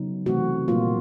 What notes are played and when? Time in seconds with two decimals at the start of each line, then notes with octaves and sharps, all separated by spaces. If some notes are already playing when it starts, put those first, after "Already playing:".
Already playing: C#3 F#3 B3 D#4
0.26 C3 E3 A3 C4 F#4
0.68 A#2 G3 A#3 D#4 F4